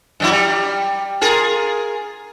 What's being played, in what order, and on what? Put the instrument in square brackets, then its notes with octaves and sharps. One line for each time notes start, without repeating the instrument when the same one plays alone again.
[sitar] F#2 F#3 E4
G3
F4 G#4 A#4